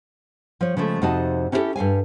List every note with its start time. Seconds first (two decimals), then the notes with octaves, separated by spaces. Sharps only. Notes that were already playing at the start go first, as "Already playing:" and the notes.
0.61 F3 C#5
0.77 C#3 F3 G#3 A3
1.02 F2 C3 D#4 F#4 D#5 A5
1.52 C#4 D#4 E4 F#4 G4 A4
1.76 G2 A4 F5 G#5